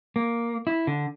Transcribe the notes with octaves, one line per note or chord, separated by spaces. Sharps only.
A#3
E4
D3